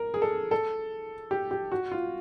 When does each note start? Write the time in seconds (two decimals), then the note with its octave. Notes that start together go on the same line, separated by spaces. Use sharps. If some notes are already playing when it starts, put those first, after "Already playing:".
Already playing: A#4
0.14 G#4
0.22 A4
0.51 A4
1.31 G4
1.51 G4
1.72 F#4
1.92 F4